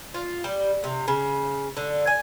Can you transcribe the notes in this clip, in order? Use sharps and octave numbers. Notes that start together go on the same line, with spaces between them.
F4
G3
C3
C#3
D3
G#5